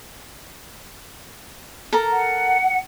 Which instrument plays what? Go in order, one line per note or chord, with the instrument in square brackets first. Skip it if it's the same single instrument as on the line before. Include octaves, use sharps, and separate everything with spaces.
[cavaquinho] A4 A#4 A#5
[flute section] F#5